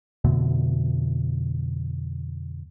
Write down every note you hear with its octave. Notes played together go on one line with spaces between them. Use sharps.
F2 B2 D3 A3